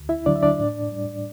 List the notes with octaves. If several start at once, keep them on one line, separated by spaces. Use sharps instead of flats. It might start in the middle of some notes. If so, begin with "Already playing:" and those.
Already playing: D2
E4 E5
D3 F#3 D4 D5
E5
D4 D5
A2
G3